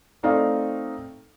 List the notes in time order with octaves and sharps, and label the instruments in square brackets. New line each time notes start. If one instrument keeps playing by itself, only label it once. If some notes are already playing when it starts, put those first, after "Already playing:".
[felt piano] A3 C4 D#4 D5 F5